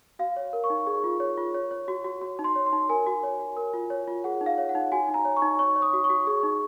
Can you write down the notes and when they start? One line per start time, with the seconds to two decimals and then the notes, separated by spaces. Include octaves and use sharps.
0.19 F#4 F5
0.36 C#5
0.53 A#4
0.64 C#6
0.70 D#4
0.87 G#4
1.04 F4
1.20 C#5
1.38 F4
1.54 C#5
1.71 C#5
1.88 F#4
2.05 F#4
2.21 F#4
2.39 D#4
2.44 C6
2.56 C#5
2.66 C6
2.73 D#4
2.89 A#4 G#5
3.07 F#4
3.23 C#5
3.40 F#4
3.57 A#4
3.74 F4
3.90 C#5
4.07 F4
4.24 G#4 F#5
4.41 D#4
4.46 F5
4.58 C#5
4.69 F#5
4.75 D#4
4.92 F#4 G#5
5.08 D#4
5.14 A#5
5.25 C#5
5.37 C#6
5.42 D#4
5.59 C#5 C#6
5.76 C#5
5.82 D#6
5.93 F#4
6.04 C#6
6.10 F#4
6.27 G#4
6.43 D#4